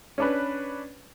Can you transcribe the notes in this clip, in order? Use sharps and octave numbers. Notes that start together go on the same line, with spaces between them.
C#4 D4 B4